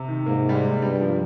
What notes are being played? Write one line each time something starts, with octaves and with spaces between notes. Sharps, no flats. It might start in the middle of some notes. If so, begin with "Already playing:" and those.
Already playing: C3
D#3
G#2 A#3
G3
G#3
G2 G3
F3